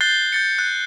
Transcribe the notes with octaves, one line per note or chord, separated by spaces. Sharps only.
F#6 G6 A6 C7 G7
G6 A6 C#7
F#6